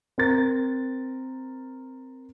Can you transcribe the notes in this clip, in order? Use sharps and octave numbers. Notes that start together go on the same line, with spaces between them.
C4 A#4 A6